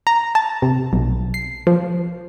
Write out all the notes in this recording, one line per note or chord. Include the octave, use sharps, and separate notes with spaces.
A#5
A5
C3
B1
C7
F3